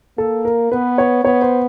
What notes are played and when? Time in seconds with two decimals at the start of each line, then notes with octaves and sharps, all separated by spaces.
0.18 A#3 A4
0.45 A#4
0.72 B3 B4
0.98 C#5
1.24 B3 C#5
1.42 C5